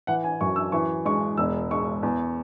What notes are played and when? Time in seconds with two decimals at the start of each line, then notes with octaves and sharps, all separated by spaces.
0.07 E3 F#5
0.24 G#5
0.41 F#2 C#6
0.56 E6
0.72 E3 C#6
1.05 G#3 C#6
1.37 E1 E6
1.71 G#3 C#6
2.03 E2